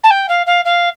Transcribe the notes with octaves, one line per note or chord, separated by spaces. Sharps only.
A5
G5
F5
F5
F5